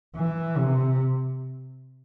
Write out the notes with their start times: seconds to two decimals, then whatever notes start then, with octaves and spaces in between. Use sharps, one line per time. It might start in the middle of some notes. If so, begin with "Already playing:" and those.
0.16 E3
0.57 C3